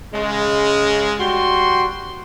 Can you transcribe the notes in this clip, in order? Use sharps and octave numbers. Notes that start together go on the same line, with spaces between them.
C#3 G#3
G3 F#4 G5 C6